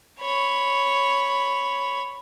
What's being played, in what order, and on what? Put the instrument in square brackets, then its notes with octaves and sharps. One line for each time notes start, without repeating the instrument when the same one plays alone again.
[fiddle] C#5 B5